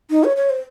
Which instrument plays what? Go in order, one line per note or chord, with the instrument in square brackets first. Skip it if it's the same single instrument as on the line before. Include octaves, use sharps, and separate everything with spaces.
[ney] D#4
C#5
C#5
C5